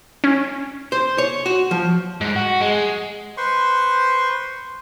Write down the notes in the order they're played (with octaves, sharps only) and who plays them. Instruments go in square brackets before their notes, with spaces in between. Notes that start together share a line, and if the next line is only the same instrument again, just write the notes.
[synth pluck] C#4
[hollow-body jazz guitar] C5
C#5
F#4
F3
[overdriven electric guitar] G#2
F#4
G#3
[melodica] B4 C5 C6 C#6